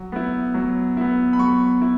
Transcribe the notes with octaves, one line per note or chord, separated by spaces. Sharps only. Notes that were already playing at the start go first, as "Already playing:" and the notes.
Already playing: F#3
B3 E4
F#3
B3 E4
B5
F#3 C#6
E4